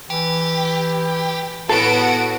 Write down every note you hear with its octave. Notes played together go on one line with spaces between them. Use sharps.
E3 G4
A2 B3 F#4 A4 F5 F#5 D7